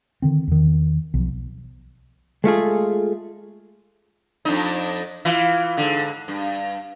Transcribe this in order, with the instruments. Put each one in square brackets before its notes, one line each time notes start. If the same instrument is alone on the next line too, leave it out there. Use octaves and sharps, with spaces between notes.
[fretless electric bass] D3 D#3 C4
E2 D#3
B1 F3
[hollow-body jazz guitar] G#3 A3 F4 G#4
[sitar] F2 D4 D#4
E3 E4 F4
G#2 D3
G2